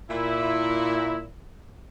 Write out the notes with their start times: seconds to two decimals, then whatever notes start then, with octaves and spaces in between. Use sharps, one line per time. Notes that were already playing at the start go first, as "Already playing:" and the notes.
0.11 A#2 E4